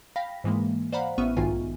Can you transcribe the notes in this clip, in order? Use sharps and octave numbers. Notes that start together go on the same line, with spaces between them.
F5 G5 B5 A#6 B6
G#2 E3 G#3 A#3
C5 D5 F5 F#5 A#5 B5
A1 B3 E5 C#6 F6 D#7
B1 G#2 D#3 F4 G#5